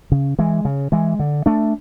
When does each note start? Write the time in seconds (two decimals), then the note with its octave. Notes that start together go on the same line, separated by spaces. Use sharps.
0.12 C#3
0.39 E3 G#3
0.65 C#3
0.92 E3 G#3
1.19 D3
1.46 A3 D4